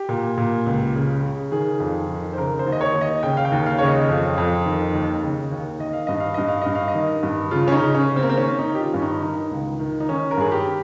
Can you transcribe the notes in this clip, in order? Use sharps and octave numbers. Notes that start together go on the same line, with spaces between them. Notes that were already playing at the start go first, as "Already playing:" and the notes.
Already playing: G4
A#2
A#2
C#2
C#3
C#3
D#3 G#4
F2
D#3
C5
C#3 A#4
C5
D#2
D#5
C#5
D#2
D#5
C#3 G5
F5
G5
D#2
F5
C#3 C#5
D#5
F2
F2
D#3
D#2
C#3
D#2
D#3 D#5
F5
G2 D#5
F5
G2 D#5
F5
G2 D#5
F5
D#5
D#3
G2
C#3 F4
C#4
D#4
C#3
C#4
C#3
C4
A#3
C4
D#3 C#4
D#4
D#3
G4
F4
G2 C#4
D#4
D#3 D#4
C#2
D#3
D#4
D#3 C#4
A#4
G2 G#4
G4